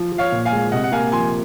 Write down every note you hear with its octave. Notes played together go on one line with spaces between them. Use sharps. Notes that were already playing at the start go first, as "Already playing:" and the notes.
Already playing: F3
F3
C#5 F5
A#2
F5 G#5
G#3
C3 D#5 F#5
F#5
A#3 F5 G#5
F3 G#5 C6